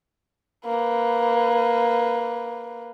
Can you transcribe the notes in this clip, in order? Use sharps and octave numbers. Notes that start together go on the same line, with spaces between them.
A#3 B4